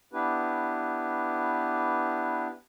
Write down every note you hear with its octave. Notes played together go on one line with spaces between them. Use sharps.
B3 D4 E4 G4 B4